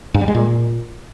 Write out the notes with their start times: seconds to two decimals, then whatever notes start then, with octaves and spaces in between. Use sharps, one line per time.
0.14 G2
0.21 G3
0.28 G#3
0.35 A#2